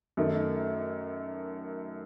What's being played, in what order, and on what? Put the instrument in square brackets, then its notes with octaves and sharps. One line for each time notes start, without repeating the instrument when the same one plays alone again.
[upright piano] F#2 D#3 A3